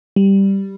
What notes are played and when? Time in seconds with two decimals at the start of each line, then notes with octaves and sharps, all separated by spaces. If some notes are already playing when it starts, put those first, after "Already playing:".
0.16 G3